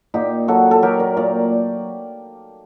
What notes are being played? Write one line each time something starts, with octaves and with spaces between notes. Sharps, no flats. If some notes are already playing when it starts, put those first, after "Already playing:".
A#2 D#4 G4
F#3 F#4 A4
A4
F#3 G4 A#4
A#4 D5
A#2 A#4 D5